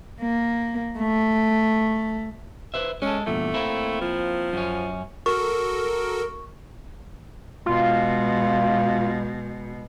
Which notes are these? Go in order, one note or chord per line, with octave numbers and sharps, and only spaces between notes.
A#3
A3
B4 C5 E5
G#3 C#4 A4
E2 G2 A#2 A3
A#3 C4 E4
F3
F#2 C#4
F#4 A4 A#4 C#6
B2 G#3 F4